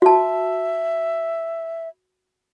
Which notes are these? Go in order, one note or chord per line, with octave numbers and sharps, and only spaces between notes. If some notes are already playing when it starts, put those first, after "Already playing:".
F#4 E5 A5